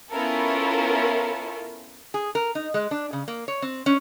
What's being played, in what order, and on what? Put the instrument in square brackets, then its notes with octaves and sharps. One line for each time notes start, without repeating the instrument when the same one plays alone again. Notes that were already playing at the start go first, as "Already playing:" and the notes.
[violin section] B3 C#4 E4 F4 A4 A#4
[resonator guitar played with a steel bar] G#4
A#4
D#4
G#3
D4
C#3
A#3
C#5
C4
C#4